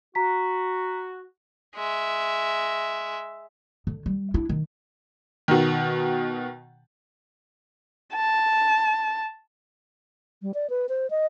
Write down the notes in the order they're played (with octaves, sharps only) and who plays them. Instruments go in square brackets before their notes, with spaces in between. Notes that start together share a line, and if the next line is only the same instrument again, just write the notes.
[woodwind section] F#4 [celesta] A#5 B6
[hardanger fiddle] G#3 E5
[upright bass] D3
G3
D4 E4
D#3
[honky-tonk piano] B2 D#3
[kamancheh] A5
[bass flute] G3
D5
B4
C5
D#5